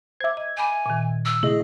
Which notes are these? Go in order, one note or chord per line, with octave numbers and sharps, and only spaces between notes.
C5 E5 D6 G#6
D#5
G#5 B5 D6 G6
A#2 D#3
E6
C3 A3 E4 G#4 D#5